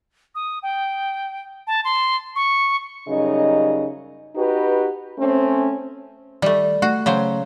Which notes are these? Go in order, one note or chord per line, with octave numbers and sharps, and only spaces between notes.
D#6
G5
A5
C6
C#6
F#2 C#3 G3 D#4 D#5
D#4 F#4 G4 B4
A3 C4 C#4
D#3 G3 A3
A3 F#4
C#3 F#3 C5